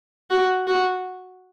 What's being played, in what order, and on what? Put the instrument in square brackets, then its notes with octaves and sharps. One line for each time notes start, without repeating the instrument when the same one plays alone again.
[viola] F#4
F#4